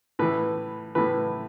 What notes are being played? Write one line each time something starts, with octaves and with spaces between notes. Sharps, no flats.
A2 E3 B4
A2 E3 B4